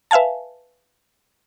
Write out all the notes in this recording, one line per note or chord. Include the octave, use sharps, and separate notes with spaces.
B4 E5 F5 G#5 A5